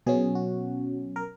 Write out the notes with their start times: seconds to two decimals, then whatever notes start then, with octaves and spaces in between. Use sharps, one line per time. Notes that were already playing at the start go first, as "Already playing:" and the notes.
0.06 B2 F#3 C#4 G#4
0.35 F#4
1.16 A#4